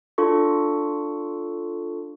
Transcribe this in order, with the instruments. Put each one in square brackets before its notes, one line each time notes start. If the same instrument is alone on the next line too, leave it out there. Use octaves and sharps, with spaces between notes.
[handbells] D4 F4 A4 C#6